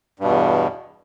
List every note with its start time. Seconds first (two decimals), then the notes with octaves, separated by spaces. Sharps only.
0.19 G2
0.24 B2
0.28 E2